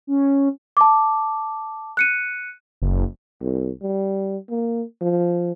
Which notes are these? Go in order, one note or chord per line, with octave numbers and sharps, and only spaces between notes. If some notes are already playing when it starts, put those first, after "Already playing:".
C#4
A5 D6
F#6 C#7 D#7
F#1
C2
G3
A#3
F3